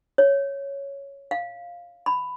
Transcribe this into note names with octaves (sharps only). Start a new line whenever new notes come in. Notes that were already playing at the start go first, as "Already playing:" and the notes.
C#5
F5
B5